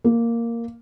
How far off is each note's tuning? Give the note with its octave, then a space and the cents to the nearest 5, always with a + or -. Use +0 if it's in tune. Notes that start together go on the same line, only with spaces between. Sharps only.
A#3 -5